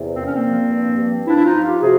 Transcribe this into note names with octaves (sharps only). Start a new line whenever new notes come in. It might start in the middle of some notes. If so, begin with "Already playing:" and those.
Already playing: E2 C3
A#2 C4
C#4
A#3 C4
F3
G2
G2
F3 D4 E4
E4
D#4 F4
F3
F4 G4
C3 F#4 G#4